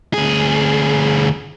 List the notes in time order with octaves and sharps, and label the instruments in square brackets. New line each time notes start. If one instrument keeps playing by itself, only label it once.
[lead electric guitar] D2 G#4